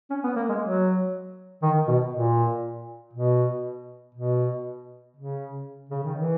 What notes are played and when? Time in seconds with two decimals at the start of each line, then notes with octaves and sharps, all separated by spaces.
0.10 C#4
0.24 B3
0.36 A#3
0.49 G#3
0.61 F#3
1.62 D#3
1.87 B2
2.13 A#2
3.13 B2
4.15 B2
5.16 C#3
5.89 C#3
6.04 D#3
6.17 E3